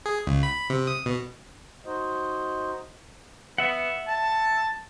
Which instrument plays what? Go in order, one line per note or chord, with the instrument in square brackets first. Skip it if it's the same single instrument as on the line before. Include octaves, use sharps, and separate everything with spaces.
[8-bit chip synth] G#4
C#2
B5
C3
D#6
B2
[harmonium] D#4 F#4 C5 D#5
[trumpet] B3 [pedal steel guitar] E5 F#5
[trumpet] A5